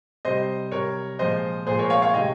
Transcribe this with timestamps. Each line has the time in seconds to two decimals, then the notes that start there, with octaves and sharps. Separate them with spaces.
0.25 C3 G3 C5 D#5
0.71 C3 G3 A#4 C#5
1.19 A#2 F3 G#3 C5 D#5
1.67 A#2 F3 G#3 G#4 C5
1.79 A#4 C#5
1.90 C#5 F5
2.02 C#5 F5
2.14 C3 D#3 G#3 D#5 G5